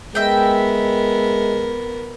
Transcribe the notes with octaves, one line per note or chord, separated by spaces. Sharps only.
G#3 B3 A#4 D#5 E5 G5